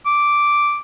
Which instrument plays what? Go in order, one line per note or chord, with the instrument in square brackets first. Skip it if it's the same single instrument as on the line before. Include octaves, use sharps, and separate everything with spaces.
[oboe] D6